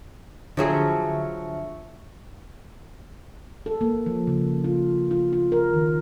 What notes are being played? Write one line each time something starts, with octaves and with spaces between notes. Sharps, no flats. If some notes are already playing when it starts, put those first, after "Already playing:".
D3 F3 F#3 G#4 E5 C#6
A4
A#3
F3
C#3
F4
F4
F4
A#4
D#3